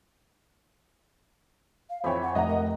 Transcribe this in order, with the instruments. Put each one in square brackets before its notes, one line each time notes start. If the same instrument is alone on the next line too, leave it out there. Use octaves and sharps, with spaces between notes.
[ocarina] F5
[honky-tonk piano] F2 E3 C#5 [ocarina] C5 [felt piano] G5 B5
[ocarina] F#5
[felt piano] F1 F#5 [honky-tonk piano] D#5 A#5 [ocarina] E5
[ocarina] A#4